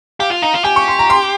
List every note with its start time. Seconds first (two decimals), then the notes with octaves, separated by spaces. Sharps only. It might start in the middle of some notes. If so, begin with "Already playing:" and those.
0.19 G4 F5
0.31 F4
0.42 D#4
0.54 F4
0.64 G4 G#5
0.76 C#6
0.88 C6
0.99 A#5
1.10 C6